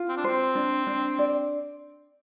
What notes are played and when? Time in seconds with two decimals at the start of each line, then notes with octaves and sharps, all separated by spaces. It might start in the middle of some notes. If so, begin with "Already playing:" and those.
Already playing: F4
0.09 C4
0.17 D4
0.24 C4 C5
0.55 D4
0.87 D4
1.19 D5